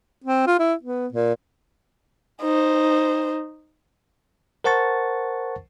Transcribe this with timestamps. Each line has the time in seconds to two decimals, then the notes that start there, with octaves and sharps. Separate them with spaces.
0.24 C4
0.47 F4
0.59 E4
0.83 B3
1.13 A#2
2.41 D#4 C5
4.64 A#4 C5 F#5 A5 C#6 A6